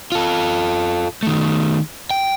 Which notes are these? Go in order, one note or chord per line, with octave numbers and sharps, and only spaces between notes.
F4 A4
D#3 A3
G5